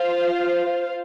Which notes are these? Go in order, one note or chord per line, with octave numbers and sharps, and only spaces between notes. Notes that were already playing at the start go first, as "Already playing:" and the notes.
Already playing: F4 C5 F5